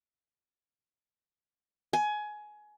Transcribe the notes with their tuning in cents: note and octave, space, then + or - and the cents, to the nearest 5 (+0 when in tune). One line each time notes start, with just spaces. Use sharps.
G#5 +20